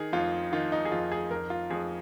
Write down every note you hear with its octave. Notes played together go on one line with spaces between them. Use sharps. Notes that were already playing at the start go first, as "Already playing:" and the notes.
Already playing: D#3 G#4
F2 F4
D#3 F4
D#4
G#4
F2 F4
G#4
F2 A#4
F4
F2 G#4